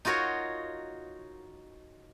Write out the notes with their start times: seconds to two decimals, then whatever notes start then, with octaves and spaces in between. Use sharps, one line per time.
0.05 D#4 F4 F#4 A#4 C#5